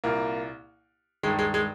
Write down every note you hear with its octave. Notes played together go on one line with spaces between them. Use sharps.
C2 A#2 A#3
G2 D#3 G#3
G#3
G#3